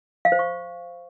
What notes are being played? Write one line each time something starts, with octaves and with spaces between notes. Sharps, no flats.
F5
C5
C#6